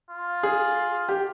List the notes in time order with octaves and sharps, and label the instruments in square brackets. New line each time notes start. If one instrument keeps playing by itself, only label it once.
[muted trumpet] F4
[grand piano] G#4
G4